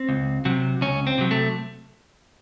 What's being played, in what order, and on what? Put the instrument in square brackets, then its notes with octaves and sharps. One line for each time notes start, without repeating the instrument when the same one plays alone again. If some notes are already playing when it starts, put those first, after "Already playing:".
Already playing: [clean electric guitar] C4
C#2
C3 F#3
C#2 C#4
C4
C3 F#3
A3